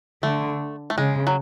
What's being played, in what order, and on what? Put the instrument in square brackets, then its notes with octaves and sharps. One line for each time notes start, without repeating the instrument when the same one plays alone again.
[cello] D3 [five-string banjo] A3
[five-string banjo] A3
[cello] C#3 [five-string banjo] G#3
[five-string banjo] F#3